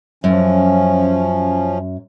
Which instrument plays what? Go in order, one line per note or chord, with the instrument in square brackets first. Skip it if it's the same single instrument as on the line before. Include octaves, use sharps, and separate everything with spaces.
[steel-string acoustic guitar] F#2 [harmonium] F3 C#4